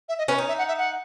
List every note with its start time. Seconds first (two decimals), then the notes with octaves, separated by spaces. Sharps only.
0.09 E5
0.19 D#5
0.28 C#4 B4
0.38 D#4 C#5
0.48 E5
0.58 F#5
0.68 E5
0.78 F#5